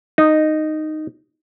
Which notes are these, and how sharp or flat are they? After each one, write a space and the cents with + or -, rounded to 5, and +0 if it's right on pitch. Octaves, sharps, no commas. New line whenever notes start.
D#4 -10